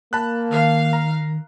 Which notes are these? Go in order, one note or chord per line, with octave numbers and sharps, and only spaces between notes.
A#3 A5 B5 F#6
D#3 F5
A#5